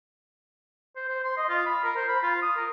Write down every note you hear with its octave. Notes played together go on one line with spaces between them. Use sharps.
C5
C5
C6
D#5
F4
B5
A#4
C5
B5
F4
D#6
A#4